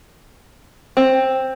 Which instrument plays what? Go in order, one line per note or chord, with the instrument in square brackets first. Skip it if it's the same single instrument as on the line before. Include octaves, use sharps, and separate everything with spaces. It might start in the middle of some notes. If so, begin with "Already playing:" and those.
[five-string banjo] C4